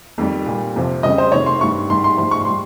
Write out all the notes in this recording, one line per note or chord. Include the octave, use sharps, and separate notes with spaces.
F2 D#3 G3
A#2 G3
F2 C3 F3
F2 C#3 G3 D#5
C5
F2 C3 D#3 C#5
C6
G2 D#3 G3 C#6
G#2 D#3 G3 C6
C6
G#2 F3 C6
C#6
G3 C6